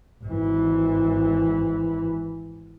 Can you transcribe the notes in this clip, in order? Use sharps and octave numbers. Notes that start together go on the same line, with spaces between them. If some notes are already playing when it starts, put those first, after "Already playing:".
G#1 E3